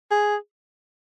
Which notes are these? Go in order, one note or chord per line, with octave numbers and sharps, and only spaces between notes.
G#4